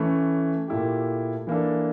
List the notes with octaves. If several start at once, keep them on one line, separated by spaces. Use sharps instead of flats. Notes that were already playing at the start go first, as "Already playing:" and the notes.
Already playing: E3 A3 C#4
A#2 A3 E4 G4
E3 A#3 D4 A4